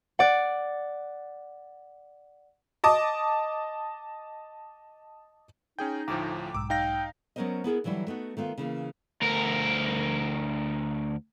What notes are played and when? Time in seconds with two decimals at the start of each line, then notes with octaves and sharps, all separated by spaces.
0.19 D5 F#5
2.84 D#5 A5 D6 D#6
5.79 C#4 D#4 G#4 G5 G6
6.08 D2 A2 F3 G5 A#5 D6
6.54 B1 G#2 D6 E6
6.70 D#4 F5 G5 A#6
7.36 F#3 B3 C#4 A#4 C5 D#5
7.64 B3 E4 G#4 A#4
7.84 D3 E3 F#3 G3 E4
8.07 A3 B3 D#4 F#4
8.37 D#3 A3 B3 F4
8.58 C#3 E3 A#3
9.22 D2 A#4